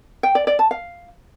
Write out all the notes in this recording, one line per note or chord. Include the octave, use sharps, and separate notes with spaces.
G5
D5
D5
A5
F5